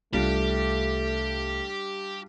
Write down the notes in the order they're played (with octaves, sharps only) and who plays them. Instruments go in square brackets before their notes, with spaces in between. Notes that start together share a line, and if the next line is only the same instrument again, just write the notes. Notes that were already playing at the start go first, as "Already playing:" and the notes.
[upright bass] C2 [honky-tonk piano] G3 D4 F4 [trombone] A3 [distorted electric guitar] G4